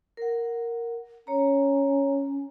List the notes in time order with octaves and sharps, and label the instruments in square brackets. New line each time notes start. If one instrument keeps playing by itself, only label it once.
[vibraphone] A#4 F#5
[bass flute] C#4 [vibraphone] C#5 A#5